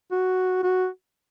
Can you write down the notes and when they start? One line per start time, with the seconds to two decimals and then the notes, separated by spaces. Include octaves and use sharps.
0.12 F#4
0.63 F#4